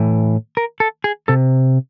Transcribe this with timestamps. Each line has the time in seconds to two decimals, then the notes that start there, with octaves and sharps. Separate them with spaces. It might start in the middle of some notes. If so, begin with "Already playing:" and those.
Already playing: A2 E3
0.57 A#4
0.80 A4
1.04 G#4
1.28 C3 A4